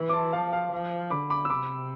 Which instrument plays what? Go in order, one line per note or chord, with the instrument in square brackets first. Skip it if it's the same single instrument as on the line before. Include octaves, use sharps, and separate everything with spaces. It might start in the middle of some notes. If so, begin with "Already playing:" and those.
Already playing: [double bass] E3
[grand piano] D6
A5 C6
[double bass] F3 [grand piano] F5 A5
[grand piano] F5
[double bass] F3
[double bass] D3 [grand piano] B5 D6
[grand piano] B5 D6
E6
[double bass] C3 [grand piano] B5 D6